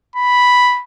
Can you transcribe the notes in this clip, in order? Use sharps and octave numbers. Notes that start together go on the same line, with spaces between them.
B5